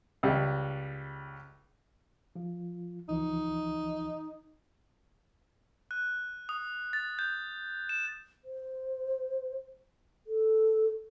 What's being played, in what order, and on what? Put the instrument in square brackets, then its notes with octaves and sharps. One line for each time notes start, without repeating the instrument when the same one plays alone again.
[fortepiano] C#2 G3
[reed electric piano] F3 F4
[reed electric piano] C#2 E3 F3 [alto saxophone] D#4
[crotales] F#6
D#6
A6
G6
E7
[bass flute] C5
A4